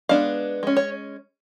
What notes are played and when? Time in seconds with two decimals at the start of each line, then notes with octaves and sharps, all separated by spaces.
0.09 G#3 B3 D4 F5
0.63 G#3 C#4
0.77 C#5